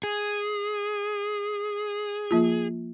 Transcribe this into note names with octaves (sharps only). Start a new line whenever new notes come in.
G#4
F3 A#3 F4